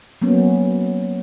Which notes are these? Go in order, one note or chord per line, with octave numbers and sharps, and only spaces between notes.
F#3 A#3 B3 C#4